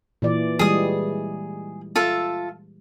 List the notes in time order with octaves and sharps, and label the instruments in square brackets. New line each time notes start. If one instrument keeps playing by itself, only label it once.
[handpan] A#2 E3 D5
[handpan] E3 G3 G#3 [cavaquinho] G#4 D#6
[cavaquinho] F4 A4 E5